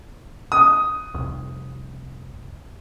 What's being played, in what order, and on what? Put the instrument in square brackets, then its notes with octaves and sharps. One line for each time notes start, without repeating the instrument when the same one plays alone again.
[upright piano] D#6
[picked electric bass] F1 C2